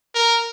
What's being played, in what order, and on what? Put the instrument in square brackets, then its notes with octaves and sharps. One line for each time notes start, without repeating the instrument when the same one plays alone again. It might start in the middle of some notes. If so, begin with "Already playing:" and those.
[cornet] A#4